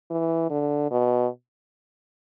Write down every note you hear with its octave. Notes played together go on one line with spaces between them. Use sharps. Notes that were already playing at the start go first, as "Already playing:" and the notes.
E3
D3
B2